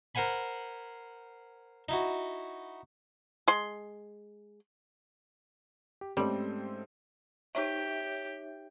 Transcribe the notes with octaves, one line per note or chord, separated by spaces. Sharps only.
A#4 C5 F#5 G#5 B5
D#4 E4 F#4
G#3 C6
G4
G#2 G3 A3 C4 C#4 A4 C5
D#4 G4 C#5 E5